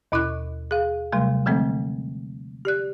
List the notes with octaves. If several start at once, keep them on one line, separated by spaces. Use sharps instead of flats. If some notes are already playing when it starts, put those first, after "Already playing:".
D#2 B2 E4 D#5 C#6 F#6
G#4 F5
C3 F#3 G3 A3
D3 F3 G#3 A3 C4 A4
G4 D5 F#6